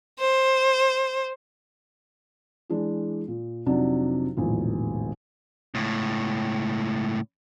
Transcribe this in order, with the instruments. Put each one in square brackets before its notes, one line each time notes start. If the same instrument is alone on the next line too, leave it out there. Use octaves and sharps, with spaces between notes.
[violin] C5
[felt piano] E3 G#3 D4
A#2
F2 C3 F#3 D4 D#4
E1 A#1 A2 D#3
[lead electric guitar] C#2 A2